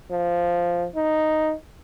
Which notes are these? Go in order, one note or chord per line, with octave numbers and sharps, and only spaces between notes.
F3
D#4